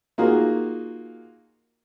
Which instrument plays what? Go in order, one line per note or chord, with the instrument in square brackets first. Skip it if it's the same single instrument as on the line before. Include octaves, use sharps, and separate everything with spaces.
[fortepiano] A#3 D#4 F4 F#4 G#4